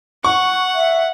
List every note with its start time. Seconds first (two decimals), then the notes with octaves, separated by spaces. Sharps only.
0.24 F#5 C#6
0.75 E5